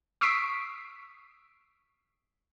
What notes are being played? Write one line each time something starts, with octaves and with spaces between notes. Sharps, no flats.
C#6 D#6 E6 B6 C7 D7